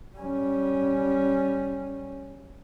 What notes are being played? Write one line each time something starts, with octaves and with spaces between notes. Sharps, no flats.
G3 C#4